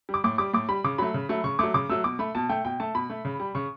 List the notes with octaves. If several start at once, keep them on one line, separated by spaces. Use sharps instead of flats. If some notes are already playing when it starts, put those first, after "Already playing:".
G3
D6
A2 D6
G3 D6
A2 D6
G3 B5
C#3 D6
F#3 A3 B5
C#3
F#3 A3
C#3 C#6
F#3 A3 D6
C#3 D6
F#3 A3 E6
B2 D6
A3 B5
B2 A5
A3 G5
B2 G5
A3 A5
B2 B5
A3
C#3
G3
C#3 C#6